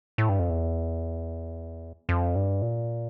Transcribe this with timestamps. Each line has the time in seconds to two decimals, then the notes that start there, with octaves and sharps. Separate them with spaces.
0.18 A2
0.29 G2
0.39 F2
0.50 E2
2.09 F2
2.36 G2
2.62 A#2